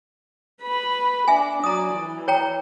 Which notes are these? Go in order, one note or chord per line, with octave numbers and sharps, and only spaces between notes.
B4 B5
D4 E5 G#5
F#3 D5 A#5 D#6
E3
C#5 G5 A#5